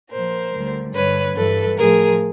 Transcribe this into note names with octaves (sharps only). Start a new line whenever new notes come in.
A#2 F3 A#4 C5
D2 D3 G3
G2 D3 G3 B4 C#5
G2 E3 G3 A4 B4
A2 F3 G#4 A#4